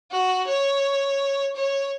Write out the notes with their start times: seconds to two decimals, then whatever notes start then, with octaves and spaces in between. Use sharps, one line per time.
0.11 F#4
0.46 C#5
1.56 C#5